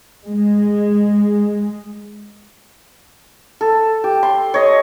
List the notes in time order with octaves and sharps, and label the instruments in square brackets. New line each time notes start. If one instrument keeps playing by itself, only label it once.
[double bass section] G#3
[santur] A4
G4
C6
C#5 D#5